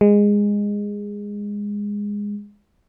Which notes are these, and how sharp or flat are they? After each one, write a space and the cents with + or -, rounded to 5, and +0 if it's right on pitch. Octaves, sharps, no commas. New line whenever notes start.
G#3 -15